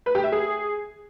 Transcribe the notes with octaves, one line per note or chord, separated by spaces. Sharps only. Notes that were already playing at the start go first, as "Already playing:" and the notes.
B4
G4
E5
G#4